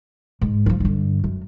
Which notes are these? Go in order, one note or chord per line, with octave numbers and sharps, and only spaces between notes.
G#2
E3 F3
G2 D3
F#2